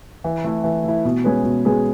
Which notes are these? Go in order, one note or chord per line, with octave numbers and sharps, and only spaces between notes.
E3
A3 E4
E3
A3 E4
B2
G#3 C#4 G#4 B4
B2
G#3 C#4 G#4 B4